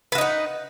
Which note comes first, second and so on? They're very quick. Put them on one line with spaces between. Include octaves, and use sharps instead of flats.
B4 F#4 D#4 F#5